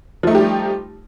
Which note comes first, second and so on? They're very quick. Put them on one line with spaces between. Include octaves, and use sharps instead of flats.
F3 A3 D#4 G4 G3